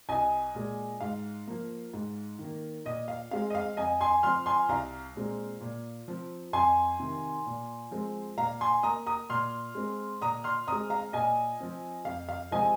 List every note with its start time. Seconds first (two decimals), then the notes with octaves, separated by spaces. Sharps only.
0.09 C2 D#5 G#5
0.55 A#2 G#3
1.01 G#2 F5
1.48 F3 A#3
1.94 G#2
2.39 D#3
2.44 A#3
2.85 A#2 D#5
3.08 F5
3.31 G#3 C4 F5
3.50 D#5
3.55 F5
3.77 F2 D#5 G#5
4.01 G#5 C6
4.23 F3 C4 C6 F6
4.46 G#5 C6
4.69 C2 F5 A#5
5.16 A#2 G#3 C4
5.61 A#2
6.08 F3 C4
6.53 F2 G#5 C6
7.00 C3 D#3
7.46 A#2
7.91 F3 G#3 C4
8.38 A#2 F5 A#5
8.61 G#5 C6
8.83 A#3 A#5 D#6
9.06 A#5 D#6
9.30 A#2 C6 F6
9.75 G#3 C4
10.21 A#2 A#5 D#6
10.44 C6 F6
10.67 G#3 C4 A#5 D#6
10.90 F5 A#5
11.13 A#2 D#5 G#5
11.60 F3 C4
12.05 F2 F5
12.29 F5
12.51 C3 F3 G#3 C4 D#5 G#5